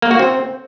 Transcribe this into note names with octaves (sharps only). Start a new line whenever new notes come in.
A#3
F#4
C4